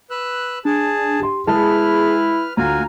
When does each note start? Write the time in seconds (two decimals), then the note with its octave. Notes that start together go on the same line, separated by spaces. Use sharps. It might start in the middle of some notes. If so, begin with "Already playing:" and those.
0.10 B4 E6 F#6
0.65 D4 G#4 A5
1.20 G4 C6
1.47 G#3 E4 G#4 B4 A5 F6
2.57 D2 F4 F#4 G#5 A#5